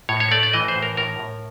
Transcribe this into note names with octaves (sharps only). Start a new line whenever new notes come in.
A2 C#5
C#5
A3 D5
D5
E3 D#5
C5
A2
A#4
A2 A#4
A2